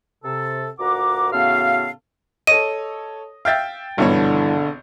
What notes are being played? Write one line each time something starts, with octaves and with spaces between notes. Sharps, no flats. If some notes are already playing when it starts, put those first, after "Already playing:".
C3 A4
D2 A#2 F#4 F#5 A#5 D6
A2 C#3 B3 F#4 A4 F5
A4 C#5 D#5 D#7
E5 F5 G5 G6 A6
G#1 G2 B2 D3 E3 C#5